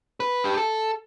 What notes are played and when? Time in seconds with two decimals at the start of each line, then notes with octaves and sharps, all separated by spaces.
0.20 B4
0.45 G4
0.57 A4